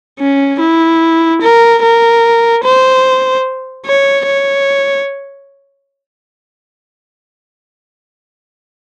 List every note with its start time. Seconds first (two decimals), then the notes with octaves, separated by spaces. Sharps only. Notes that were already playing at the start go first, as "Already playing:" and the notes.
0.19 C#4
0.60 E4
1.42 A#4
1.82 A#4
2.64 C5
3.86 C#5
4.27 C#5